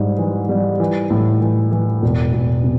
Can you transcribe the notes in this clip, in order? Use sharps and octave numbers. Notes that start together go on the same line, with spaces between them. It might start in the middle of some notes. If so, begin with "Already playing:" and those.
Already playing: G#2 G3
E3
G3
E3
A2
E3
E3
E1
E1
C3